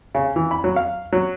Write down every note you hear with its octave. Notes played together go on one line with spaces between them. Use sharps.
C#3
E3
B5
F#3
F5
F#3